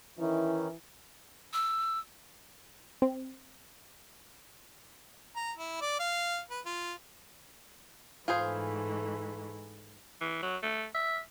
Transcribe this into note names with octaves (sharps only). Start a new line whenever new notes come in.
D#3 E3 C#4 D#4 E4
E6
C4
A#5
E4
D5
F5
B4
F4
G#2 E3 A3 F4 G#4 C5
E3
F#3
A3
E5